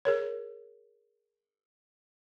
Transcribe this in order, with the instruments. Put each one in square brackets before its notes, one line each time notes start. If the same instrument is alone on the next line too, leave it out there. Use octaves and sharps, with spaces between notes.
[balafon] G#4 A#4 C#5